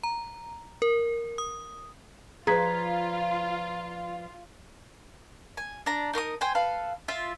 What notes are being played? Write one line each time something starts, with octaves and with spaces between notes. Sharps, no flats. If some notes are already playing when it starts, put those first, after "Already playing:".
A#5
A#4
D#6
F3 F4 G#4 B4 D5 A#5 G#6 B6
G#5
D4 A#5
D#4 A#4 C6 D#6
C5 G5 G#5
A4 B4 F5
F4 E5